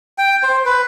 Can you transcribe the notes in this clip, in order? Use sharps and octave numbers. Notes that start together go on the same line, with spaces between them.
G5
C5
B4